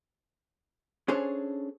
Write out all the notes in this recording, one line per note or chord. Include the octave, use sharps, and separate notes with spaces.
C#4 D4 G#4 A4 C5 C#5